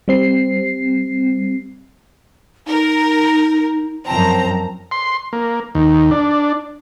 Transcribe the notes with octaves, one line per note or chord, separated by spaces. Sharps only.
G3 C4 C7
D#4 A#4
F#2 F3 C4 A5 A#5
C6
A#3
D#2
D4